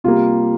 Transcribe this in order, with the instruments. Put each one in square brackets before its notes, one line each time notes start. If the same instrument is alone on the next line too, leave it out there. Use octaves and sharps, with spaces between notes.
[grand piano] C3 G3 A#3 F4